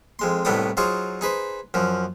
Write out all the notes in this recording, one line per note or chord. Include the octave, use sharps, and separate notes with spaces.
F2 G#3 C6
C2 A2 B3 D4 D#4 D#6
F#3 D#4 F4 G#4 C5 D#5
D#4 G#4 B4 C5
F#2 F3